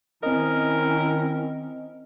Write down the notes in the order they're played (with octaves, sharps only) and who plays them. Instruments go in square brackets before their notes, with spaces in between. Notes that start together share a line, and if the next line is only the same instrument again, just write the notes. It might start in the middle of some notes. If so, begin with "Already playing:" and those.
[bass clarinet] D#3 [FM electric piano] C4 D#5 [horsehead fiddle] C#4 E4 [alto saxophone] A#4